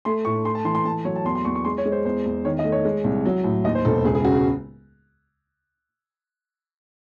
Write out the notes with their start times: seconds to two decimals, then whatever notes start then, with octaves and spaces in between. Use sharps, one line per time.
0.05 A3 C6
0.25 A2 C#6
0.45 A3 C6
0.55 A5
0.65 E3 C6
0.75 C6
0.85 A3 A5
1.05 F#3 C#5
1.16 A5
1.25 E2 C6
1.35 C6
1.45 E2 C#6
1.55 C#6
1.65 G#3 C6
1.78 C#5
1.86 G#3
1.92 C5
2.05 E2 C5
2.26 E2
2.45 D#3 C#5
2.59 D#5
2.65 A3
2.72 C#5
2.85 G#3
3.04 C2
3.26 F#3
3.44 A2
3.64 D#2 D#5
3.75 C5
3.85 E1 A4
4.05 C#2 G#4
4.15 G#4
4.25 C#3 F#4
4.35 G#4